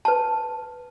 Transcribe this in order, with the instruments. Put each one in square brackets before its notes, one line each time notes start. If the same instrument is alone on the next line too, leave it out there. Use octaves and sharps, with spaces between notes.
[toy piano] B4 A5